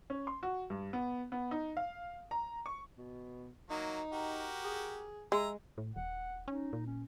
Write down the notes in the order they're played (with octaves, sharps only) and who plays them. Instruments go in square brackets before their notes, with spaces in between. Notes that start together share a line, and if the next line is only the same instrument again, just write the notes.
[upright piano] C#4
C6
F#4
G2
B3
B3
D#4
F5
A#5
C#6
[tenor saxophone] B2
[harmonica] F#3 A#3 [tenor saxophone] D#4
[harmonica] F#4 G4 A#4
[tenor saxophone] G#4
[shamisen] G#3 [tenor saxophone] E5 [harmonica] A#5
[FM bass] A2
[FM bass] D#1 [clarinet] F#5
[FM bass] C#4 [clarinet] D#4
[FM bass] A#2
[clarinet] C#4